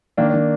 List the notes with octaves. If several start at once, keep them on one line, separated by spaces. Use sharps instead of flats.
D#3 A#3 D4
D#3 D4